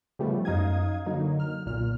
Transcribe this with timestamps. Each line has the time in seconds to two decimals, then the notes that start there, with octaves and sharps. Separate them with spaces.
0.19 C#3 F3 G3 A3 B3 C#4
0.45 F#2 D#4 F5 D#6 G#6
1.06 D3 F#3 A#3 D#4
1.40 F6
1.66 B1 A#2 F6